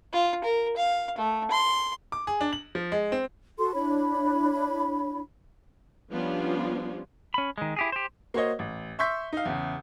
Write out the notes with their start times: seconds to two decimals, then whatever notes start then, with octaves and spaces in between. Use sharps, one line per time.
0.13 F4
0.44 A#4
0.77 F5
1.18 A3
1.51 C6
2.12 D6
2.27 G#4
2.41 D4
2.53 F#7
2.75 F3
2.92 G#3
3.12 C4
3.57 F#4 A4 C6
3.74 D4 E4 C#5 B5
6.11 F3 G3 B3 C#4 D4 F4
7.34 C#4 B5
7.58 D#3 G#3
7.76 E4 G4 G#4
7.92 G4 C5
8.34 A#3 F#4 C5 C#5 D#5
8.59 A1
8.99 E5 C6 C#6 E6 G6 B6
9.33 D#4 F5
9.45 E2 C#3